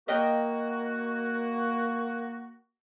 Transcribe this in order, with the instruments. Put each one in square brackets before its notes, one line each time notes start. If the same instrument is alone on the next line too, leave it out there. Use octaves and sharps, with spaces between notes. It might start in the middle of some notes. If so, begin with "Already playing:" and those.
[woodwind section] A#3 F#4 [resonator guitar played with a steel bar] A#4 D#5 G5